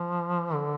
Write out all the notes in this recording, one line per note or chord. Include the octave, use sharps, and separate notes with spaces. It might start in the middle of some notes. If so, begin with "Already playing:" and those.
Already playing: F3
D3